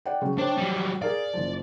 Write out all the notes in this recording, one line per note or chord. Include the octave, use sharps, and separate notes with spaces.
D5 F#5 G5
C#3 F#3
D4 C5 C#5 G5
F#3 G3
G#4 A#4 D5 F5
F#1 F3